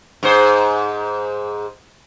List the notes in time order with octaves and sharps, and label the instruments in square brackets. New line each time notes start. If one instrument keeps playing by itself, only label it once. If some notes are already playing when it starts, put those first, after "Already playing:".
[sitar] G#2 C5